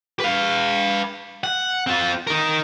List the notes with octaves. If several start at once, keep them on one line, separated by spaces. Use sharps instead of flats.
B4 F5
F#5
C4 F4
D#4 A#4